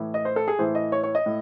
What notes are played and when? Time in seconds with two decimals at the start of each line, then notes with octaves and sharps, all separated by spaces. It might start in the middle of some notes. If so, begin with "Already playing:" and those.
Already playing: A2 E3
0.14 D#5
0.25 C5
0.36 A4
0.48 G#4
0.59 A2 E3 C5
0.75 D#5
0.92 C#5
1.03 C#5
1.15 D#5
1.26 A2